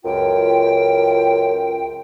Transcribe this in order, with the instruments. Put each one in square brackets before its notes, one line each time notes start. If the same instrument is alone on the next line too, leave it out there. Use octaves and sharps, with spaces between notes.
[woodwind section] C#2 F#2 F4 G5